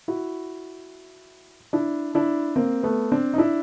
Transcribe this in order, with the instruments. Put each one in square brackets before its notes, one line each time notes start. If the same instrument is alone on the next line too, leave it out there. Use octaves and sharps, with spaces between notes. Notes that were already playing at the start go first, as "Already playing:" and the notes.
[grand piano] E4 F#4
D4 E4
D4 E4
A#3 C4
A3 B3
C4 D4
D#4
D4 E4